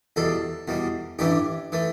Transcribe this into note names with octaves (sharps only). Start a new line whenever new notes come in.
E2 B2 G3 A4
E2 B2 G3
A1 G2 E3 A3 G4
E3 A3